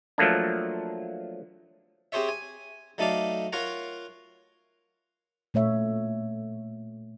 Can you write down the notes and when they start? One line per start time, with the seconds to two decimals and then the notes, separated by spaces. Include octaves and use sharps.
0.18 F3 F#3 A3 A#3 D4
2.12 C4 G4 G#4 C5 C#5 E5
2.29 G#5
2.98 F#3 A3 D#4 A4 D5 F5
3.53 F4 A#4 C#5 F5 F#5 A#5
5.54 A#2 A3 C#5 E5